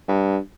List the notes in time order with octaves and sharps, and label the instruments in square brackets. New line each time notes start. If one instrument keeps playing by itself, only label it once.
[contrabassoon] G2